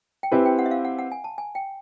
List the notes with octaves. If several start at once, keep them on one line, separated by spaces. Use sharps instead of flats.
G5
C4 E4 G4 B4 G#5
G5
F#5
E5
F5
F#5
F#5
G#5
A5
G#5
G5